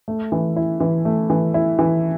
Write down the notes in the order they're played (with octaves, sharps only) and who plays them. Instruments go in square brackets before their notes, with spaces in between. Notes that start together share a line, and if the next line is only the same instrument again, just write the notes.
[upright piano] A3
E3
E4
E3
A3
E3
E4
E3